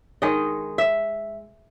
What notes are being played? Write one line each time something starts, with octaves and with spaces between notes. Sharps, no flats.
D#3 G#3 D#4 D#5
E5